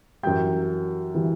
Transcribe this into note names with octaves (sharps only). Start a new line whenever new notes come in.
F#2 E3 G3 G5 G6
E3 G3